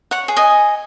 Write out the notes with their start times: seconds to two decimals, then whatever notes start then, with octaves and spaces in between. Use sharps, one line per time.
0.11 C#5 F#5
0.28 G#4
0.37 D#5 G#5